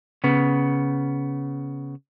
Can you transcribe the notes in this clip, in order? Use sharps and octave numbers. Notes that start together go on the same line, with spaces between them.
C#3 B3